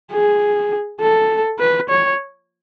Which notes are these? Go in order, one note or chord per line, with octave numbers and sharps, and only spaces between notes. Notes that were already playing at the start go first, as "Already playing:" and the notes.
G#4
A4
B4
C#5